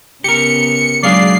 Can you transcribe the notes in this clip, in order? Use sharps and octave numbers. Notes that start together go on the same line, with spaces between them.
C#3 B3 G4 A#4 C#7
F#3 G#3 D4 G#4 D5 F5 C7